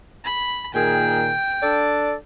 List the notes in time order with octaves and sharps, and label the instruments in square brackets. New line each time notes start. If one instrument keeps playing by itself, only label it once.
[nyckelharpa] B5
[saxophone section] A#2 D#3 G#4 [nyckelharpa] G5
[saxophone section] D4 A4 D5